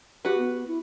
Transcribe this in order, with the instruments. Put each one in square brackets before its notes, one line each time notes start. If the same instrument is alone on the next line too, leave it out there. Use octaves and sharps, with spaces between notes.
[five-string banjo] F#4 B4 [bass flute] G4
[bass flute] B3
E4